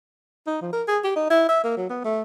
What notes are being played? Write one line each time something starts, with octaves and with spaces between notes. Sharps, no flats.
D#4
F3
A#4
G#4
G4
D#4
E4
E5
A#3
F#3
B3
A3